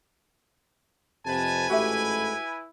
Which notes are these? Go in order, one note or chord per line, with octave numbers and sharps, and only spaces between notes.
F2 C3 B4 G#5 A5
A1 G#2 A3 E4 F#4 G4 E5